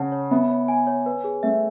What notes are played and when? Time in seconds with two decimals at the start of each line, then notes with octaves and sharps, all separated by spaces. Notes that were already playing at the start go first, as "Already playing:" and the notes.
Already playing: C#3 C#5 F#5 A5
0.12 C#5
0.31 B3 E5
0.50 C#5
0.68 G#5
0.87 C#5
1.06 B4
1.24 G#4
1.43 A3 E5